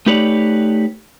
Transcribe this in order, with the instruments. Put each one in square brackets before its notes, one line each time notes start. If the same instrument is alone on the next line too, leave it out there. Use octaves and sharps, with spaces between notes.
[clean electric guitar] A3 D#4 G4 B4 C#5 D5